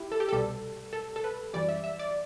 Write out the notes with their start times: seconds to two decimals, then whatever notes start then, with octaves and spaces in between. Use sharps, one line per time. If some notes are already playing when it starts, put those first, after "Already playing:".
Already playing: E4 G4
0.12 A4
0.20 G4
0.29 C2 B2 G3 A4
0.93 A4
1.16 A4
1.24 B4
1.54 F#2 E3 G3 D5
1.69 E5
1.84 E5
1.99 D5